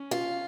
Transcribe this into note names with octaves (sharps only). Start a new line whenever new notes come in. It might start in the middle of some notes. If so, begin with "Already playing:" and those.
Already playing: C#4
F4